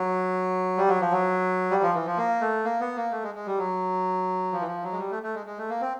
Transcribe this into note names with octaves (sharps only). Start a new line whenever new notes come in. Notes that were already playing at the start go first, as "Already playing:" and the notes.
Already playing: F#3
G3
F#3
F3
F#3
G3
F3
E3
F3
A#3
A3
A#3
B3
A#3
A3
G#3
G#3
G3
F#3
F3
E3
F3
F#3
G#3
G3
A3
A3
G#3
G#3
A3
A#3
C4